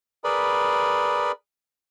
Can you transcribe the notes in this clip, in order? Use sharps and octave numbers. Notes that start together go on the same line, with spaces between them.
G#4 A#4 B4 D5 B5